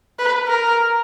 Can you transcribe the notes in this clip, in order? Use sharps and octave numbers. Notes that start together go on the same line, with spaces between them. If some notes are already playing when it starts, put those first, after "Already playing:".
B4
A#4